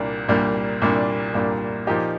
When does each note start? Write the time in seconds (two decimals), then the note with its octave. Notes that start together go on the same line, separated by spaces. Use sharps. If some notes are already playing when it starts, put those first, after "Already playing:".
Already playing: C2 A#2 G3 A#3 D4
0.29 C2 A#2 G3 A#3 D4
0.82 C2 A#2 G3 A#3 D4
1.34 C2 A#2 G3 A#3 D4
1.87 A#2 F3 A#3 D#4 G4